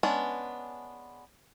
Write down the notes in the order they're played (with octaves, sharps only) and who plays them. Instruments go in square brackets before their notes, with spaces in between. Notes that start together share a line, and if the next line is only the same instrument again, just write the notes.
[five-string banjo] G#3 B3 C#4 D4